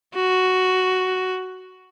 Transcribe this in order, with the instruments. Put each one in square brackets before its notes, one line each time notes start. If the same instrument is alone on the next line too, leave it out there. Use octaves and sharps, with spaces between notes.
[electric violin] F#4